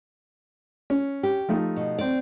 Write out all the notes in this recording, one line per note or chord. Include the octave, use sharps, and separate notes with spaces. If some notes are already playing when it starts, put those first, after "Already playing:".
C#4
G4
F3 A3 D#4
B2
C4 D5